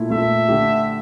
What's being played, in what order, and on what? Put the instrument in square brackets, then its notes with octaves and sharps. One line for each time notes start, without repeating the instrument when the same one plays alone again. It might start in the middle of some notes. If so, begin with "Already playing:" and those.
Already playing: [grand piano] A#2 A3 E4
[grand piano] A#2 A3 E4 [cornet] E5
[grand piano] D3 A3 E4 G4